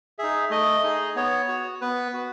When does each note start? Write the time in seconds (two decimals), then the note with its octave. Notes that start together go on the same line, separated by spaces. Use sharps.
0.19 D#4 G#4 E5
0.50 A3 D#5
0.84 D#4 G#4
1.16 B3 C#5
1.49 F#4
1.81 B3 B4
2.14 F#4